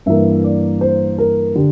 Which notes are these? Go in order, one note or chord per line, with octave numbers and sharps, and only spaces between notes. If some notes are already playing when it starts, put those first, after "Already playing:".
G2 E3 A#3 E5
D5
C5
A#4
D3 G4